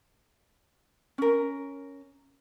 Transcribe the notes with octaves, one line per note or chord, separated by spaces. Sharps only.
C#4 A#4